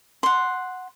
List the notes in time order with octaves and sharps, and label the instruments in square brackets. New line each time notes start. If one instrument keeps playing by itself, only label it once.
[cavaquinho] F#5 C6